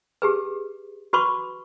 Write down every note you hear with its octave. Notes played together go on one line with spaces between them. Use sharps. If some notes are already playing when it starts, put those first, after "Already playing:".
G4 G#4 B4
F#4 B4 B5 C#6 D6